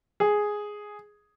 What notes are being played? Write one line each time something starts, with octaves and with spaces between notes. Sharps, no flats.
G#4